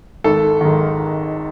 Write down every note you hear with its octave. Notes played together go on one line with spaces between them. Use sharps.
G#1 A4
G#2 D#3